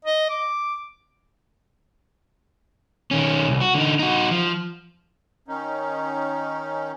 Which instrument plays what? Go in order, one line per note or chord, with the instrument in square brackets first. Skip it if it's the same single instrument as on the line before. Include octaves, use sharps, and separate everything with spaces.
[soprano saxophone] D#5
D6
[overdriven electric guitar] D#3 C#4
C2
F#4
D3 D#4
D#4 F#4
F3
[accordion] D#3 C#4 D#4